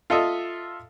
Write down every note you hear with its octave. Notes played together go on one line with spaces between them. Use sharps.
F4 A4 D#5 E5